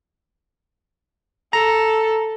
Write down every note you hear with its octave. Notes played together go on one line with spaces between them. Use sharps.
A4 A#5